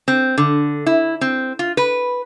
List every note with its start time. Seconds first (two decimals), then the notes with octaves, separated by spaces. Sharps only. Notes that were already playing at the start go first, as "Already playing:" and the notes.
0.08 C4
0.38 D3
0.86 E4
1.21 C4
1.59 F4
1.77 B4